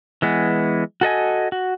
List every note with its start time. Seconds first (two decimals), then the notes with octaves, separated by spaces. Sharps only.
0.22 E3 G#3 B3
1.01 F#4 A4 D#5 G#5
1.52 F#4